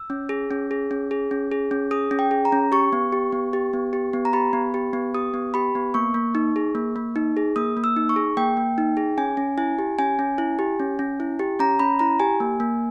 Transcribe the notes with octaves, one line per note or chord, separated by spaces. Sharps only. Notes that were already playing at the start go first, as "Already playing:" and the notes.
Already playing: E6
C#4
G#4
C#4
G#4
C#4
G#4
C#4
G#4
C#4
G#4 D#6
C#4
G5
G#4
A#5
C#4
G4 C#6
B3
G4
B3
G4
B3
G4
B3
A#5
G4 B5
B3
G4
B3
G4 D#6
B3
G4 B5
B3
A#3 C#6
A#3
D#4
G#4
A#3
A#3
D#4
G#4
A#3 D#6
A#3
E6
D#4
C#6
G#4
A#3 G5
A#3
D#4
G#4
C#4 G#5
C#4
E4 G#5
G4
C#4 G#5
C#4
E4
G4
C#4
C#4
E4
G4
C#4 A#5
C#4 B5
E4 A#5
G4 G#5
A#3
A#3